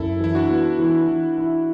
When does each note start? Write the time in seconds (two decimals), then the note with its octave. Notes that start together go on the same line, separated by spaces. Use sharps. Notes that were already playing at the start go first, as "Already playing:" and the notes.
Already playing: F#2 E4 A4
0.20 E3 E4
0.35 D4 F#4
0.49 B3
0.78 E3
1.08 E3
1.38 E4